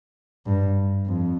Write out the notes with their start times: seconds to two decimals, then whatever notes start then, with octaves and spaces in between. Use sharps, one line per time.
0.46 G2
1.07 F2